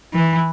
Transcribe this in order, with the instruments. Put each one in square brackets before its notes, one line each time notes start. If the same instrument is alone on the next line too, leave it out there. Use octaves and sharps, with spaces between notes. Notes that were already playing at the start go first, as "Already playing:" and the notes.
[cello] E3